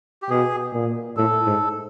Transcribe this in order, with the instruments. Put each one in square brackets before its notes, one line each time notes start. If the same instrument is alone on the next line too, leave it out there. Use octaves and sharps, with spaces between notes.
[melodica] G4
[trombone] B2 [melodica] G#4
[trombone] A#2
[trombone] A2 [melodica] A4
[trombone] G#2